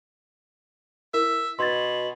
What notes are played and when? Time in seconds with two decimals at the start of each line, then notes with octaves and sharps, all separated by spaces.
1.14 E4 A#4 E5
1.59 B2 C6 G#6 A6